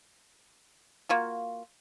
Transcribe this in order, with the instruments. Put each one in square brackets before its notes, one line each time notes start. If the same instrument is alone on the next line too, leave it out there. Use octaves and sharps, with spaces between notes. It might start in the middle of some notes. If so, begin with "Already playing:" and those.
[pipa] A#3 F4 F#4